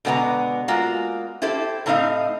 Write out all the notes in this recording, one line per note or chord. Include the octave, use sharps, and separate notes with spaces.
B2 D3 G#3 B3 F5 A#5
G#3 A#3 F4 F#4
E4 G4 A4 C5
A2 A3 C4 D#4 D#5 F5